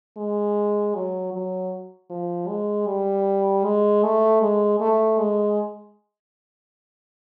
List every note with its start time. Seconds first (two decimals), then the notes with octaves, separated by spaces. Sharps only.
0.17 G#3
0.95 F#3
1.34 F#3
2.10 F3
2.48 G#3
2.87 G3
3.65 G#3
4.03 A3
4.42 G#3
4.80 A3
5.19 G#3